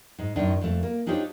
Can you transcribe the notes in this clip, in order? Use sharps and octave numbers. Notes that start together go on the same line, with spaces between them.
G#2
F#2 A2 D#3 D4
F2 A3
A#3
D4 D#4 F4 G4 C5 C#5